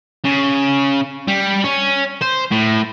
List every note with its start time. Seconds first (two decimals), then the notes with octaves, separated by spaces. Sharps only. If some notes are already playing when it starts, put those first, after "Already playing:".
0.25 C#3
1.28 G3
1.64 C#4
2.22 C5
2.52 A2